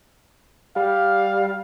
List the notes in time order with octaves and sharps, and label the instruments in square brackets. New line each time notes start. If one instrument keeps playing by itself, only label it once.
[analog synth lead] G3 [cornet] F5